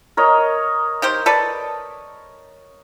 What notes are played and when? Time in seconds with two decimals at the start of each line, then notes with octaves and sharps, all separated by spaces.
0.17 A#4 C#5 D#5
1.02 D#3 G4 C5
1.26 A4 B4 D5